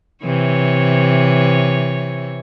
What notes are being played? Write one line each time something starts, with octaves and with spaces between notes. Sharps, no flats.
C3 E3 C#5